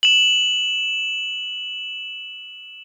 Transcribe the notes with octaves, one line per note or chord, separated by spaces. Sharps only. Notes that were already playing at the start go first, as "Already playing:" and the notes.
E7 F#7